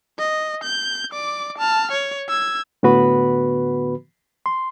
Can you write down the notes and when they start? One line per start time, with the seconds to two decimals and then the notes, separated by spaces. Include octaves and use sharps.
0.18 D#5
0.63 G6
1.11 D5 D6
1.58 A5 F6
1.91 C#5
2.29 E6 G#6
2.83 A2 D3 B3 F#4 B4 B5
4.46 C6